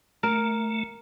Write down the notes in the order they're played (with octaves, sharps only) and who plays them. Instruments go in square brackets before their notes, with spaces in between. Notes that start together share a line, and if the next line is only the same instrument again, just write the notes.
[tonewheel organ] A3 [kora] A#4